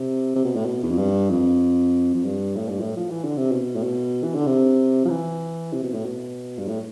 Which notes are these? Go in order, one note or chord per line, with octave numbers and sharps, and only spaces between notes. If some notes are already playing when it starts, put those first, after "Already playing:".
Already playing: C3
C3
B2
A2
B2
E2
F2
G2
F2
F2
G2
A2
G2
A2
F3
E3
D3
C3
B2
A2
B2
E3
D3
C3
F3
E3
C3
B2
A2
B2
G2
A2